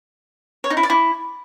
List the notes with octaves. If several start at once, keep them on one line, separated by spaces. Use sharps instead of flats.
C#5
D#4
E4
D5
E4